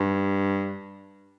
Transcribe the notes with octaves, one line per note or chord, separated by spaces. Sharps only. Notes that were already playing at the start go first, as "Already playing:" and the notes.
Already playing: G2